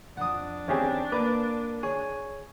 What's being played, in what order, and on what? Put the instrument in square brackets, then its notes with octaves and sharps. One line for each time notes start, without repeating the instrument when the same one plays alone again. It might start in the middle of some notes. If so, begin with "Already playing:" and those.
[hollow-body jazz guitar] B1 F2 [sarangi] D4 [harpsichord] F#5 D#6
[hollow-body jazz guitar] E2 D#3 C4 [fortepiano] C#4 G4 G#4
[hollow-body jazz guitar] A#3 [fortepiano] B4 [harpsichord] D5
[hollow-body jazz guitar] G#4 [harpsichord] C#5